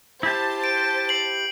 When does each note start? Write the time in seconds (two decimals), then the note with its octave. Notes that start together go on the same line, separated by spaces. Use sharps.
0.23 E4 G4 C5 A5 A6
0.64 D7
1.09 C7 F#7